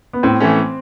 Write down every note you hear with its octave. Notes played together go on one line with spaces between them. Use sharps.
B3
A2 C4
E3 A3 C#4